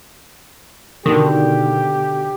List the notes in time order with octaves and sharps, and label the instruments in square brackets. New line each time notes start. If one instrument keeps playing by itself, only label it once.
[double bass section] B2 [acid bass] D3 [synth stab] D#3 [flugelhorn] G4